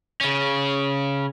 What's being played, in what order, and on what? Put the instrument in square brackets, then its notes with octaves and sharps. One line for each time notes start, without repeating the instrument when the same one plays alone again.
[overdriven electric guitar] C#3 C#4